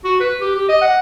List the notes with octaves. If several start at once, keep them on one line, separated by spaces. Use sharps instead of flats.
F#4
B4
G4
G4
D#5
F#5